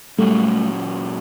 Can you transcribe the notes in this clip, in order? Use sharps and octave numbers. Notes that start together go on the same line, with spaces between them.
A#2 F#3 G3 A3 A#3 C#4 F#4